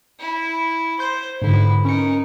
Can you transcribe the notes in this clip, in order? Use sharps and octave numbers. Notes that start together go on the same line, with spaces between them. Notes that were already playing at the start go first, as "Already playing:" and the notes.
E4
C5 C6 G6
G#2 D3 E4 B4
C#4 D#4 A#4 C#7